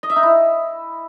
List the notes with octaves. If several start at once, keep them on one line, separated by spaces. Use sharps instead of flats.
D#5
E5
D#4
E4